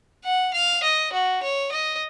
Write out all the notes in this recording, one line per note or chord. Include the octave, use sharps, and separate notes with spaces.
F#5
F5
D#5
F#4
C#5
D#5